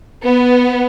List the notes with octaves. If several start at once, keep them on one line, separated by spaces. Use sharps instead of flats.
B3